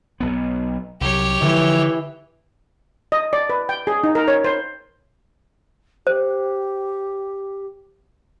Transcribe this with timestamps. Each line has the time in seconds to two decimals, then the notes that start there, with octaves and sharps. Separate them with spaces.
0.20 B1 B3
1.01 C2 F#3 G4 C#5
1.42 D3 E3 F3 G3 G#3
3.12 D#5
3.33 D5
3.50 B4
3.69 G5
3.87 G#4
4.04 D#4
4.15 A#4
4.28 C#5
4.44 C5
6.07 G4 C5